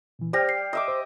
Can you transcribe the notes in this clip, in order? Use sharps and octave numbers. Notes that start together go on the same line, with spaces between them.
A#2 E3
G4 C5 D5 G5 F6 A#6
C7
D#5 E5 D6
C5